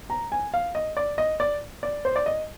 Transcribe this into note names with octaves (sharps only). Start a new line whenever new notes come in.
A#5
G#5
F5
D#5
D5
D#5
D5
D5
C5
D5
D#5